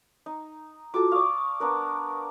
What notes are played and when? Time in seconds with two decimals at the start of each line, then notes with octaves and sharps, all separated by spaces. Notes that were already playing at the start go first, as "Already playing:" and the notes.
0.26 D#4
0.94 F4 F#4 A4 A5 D6
1.12 D5 F5 C#6 D#6
1.60 B3 D4 A#4